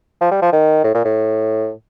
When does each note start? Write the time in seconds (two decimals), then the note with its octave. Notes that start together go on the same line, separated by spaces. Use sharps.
0.21 F3
0.31 G3
0.42 F3
0.53 D#3
0.84 A2
0.94 A#2
1.05 A2